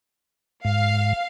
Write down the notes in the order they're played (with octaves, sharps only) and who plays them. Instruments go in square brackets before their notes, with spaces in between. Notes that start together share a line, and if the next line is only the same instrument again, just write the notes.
[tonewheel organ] G#2 [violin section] F5